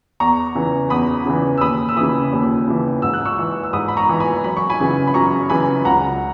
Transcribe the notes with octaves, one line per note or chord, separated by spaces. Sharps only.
E2 A#5 C#6
C#3 E3
E2 B5 D#6
C#3 E3
E6
D#2 B5 D#6
E6
C#3 E3 B5 D#6
D#2
C#3 E3
G#2 E6
F#6
C#6 E6
E3
E6
G#2 B5 D#6
B5
A#5 C#6
E3
G#5 B5
F#2 B5
C#6
G#5 B5
C#3 E3
B5
F#2 A#5 C#6
C#3 E3 G#5 B5
C#2 F#5 A#5